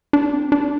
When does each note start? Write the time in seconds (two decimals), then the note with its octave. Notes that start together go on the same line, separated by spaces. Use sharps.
0.13 D4
0.33 C4
0.52 D4